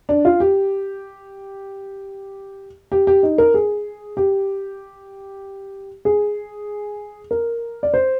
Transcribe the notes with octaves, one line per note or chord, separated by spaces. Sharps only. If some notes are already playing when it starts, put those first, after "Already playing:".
D4
F4
G4
G4
G4
D#4
A#4
G#4
G4
G#4
A#4
D5
C5